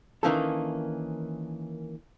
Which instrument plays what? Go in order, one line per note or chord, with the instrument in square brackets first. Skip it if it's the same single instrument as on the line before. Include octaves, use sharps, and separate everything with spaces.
[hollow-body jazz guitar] D#3 E3 A#3 C#4 D4 A4